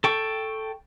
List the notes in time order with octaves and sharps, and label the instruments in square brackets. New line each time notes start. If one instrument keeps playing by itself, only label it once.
[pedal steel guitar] A4 G5 C#6